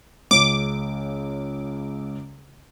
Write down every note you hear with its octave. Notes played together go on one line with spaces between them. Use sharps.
C#2 C#3 D6